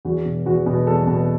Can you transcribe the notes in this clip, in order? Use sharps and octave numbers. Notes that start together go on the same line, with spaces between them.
E2 F#4
B2
E2 F#4
B2
E2 A4
B2